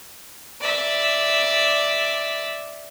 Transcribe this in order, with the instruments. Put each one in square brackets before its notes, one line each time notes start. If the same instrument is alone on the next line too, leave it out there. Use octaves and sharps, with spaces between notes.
[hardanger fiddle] D5 E5